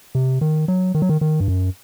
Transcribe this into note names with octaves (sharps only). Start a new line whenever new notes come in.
C3
D#3
F#3
D#3
F#3
D#3
D#3
G2
F#2